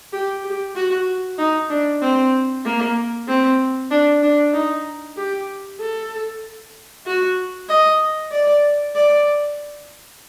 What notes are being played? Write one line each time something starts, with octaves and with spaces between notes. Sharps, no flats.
G4
G4
F#4
D#4
D4
C4
A#3
C4
D4
D4
D#4
G4
A4
F#4
D#5
D5
D5